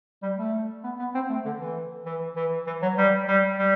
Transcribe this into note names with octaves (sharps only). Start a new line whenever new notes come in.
G3
A3
B3
B3
C4
A3
D3
E3
E3
E3
E3
F#3
G3
G3
G3